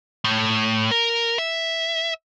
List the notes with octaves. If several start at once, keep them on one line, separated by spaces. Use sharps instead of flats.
A2
A#4
E5